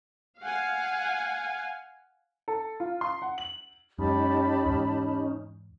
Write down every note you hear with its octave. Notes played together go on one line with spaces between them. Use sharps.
F5 F#5 G#5
A4
F4
C6
F#5
F#7
F#2 G#3 C#4 D#4 G4 A5 B5
E2 G#2